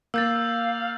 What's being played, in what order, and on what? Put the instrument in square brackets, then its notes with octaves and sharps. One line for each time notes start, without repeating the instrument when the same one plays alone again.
[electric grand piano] A#3 [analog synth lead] F5 [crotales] E6 G6 A6